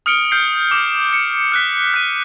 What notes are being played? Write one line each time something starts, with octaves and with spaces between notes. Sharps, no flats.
D#6 F6 C#7 D7 G7
F6 G6 C7
D6
C#7
F6 F#6 B6
F#6 D#7